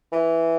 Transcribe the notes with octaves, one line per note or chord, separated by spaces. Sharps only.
E3